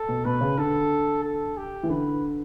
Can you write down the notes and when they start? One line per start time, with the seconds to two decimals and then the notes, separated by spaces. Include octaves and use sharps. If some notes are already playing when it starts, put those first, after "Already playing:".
Already playing: A4
0.09 B2
0.25 B2 B4
0.41 C#3
0.58 D3 A4
1.24 A4
1.57 G4
1.83 E3
1.89 D3 B4